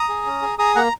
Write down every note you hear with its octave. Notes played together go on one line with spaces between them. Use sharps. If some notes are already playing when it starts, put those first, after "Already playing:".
Already playing: A#5 D#6
G#4
C#4
G#4
G#4 A#5 D#6
A#3 F#5 A#5